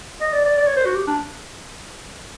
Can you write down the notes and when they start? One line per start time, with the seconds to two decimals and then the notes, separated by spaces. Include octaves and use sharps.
0.21 D#5
0.32 D5
0.45 D5
0.58 D5
0.67 C#5
0.76 C5
0.86 F#4
0.95 G4
1.07 D4